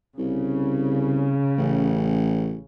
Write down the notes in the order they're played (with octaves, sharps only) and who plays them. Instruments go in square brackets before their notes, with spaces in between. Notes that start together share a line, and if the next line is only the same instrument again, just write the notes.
[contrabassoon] C2 [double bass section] C#3
[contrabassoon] A1